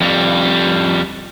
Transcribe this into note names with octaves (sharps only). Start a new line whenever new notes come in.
F2 G3